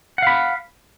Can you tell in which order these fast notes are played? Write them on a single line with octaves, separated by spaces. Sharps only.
F#5 F5 B5